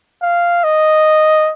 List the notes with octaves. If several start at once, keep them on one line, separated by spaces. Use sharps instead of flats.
F5
D#5